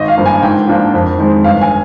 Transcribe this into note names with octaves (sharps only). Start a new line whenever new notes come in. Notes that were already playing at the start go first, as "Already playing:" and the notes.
Already playing: G#1 D#5
F5
G2 F3 A#3
G#5
G#2 G5
F3 A#3 D4
F2
D#3 G#3 C4
G1 F5
G#5